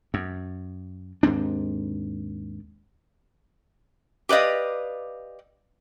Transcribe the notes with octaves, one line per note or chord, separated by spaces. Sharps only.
F#2
D#2 G#2 C4 D4
G4 B4 D5 D#5 F5